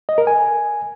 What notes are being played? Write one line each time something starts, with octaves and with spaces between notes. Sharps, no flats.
D#5
A#4
G#5